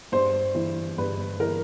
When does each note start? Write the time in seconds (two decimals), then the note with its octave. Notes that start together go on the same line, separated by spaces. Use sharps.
0.12 G2 C5
0.55 E3
0.98 G2 B4
1.40 E3 A#4